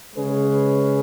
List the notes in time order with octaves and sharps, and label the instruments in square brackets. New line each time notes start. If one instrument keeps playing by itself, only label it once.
[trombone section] C#3 G#3 C#4 G#4 B4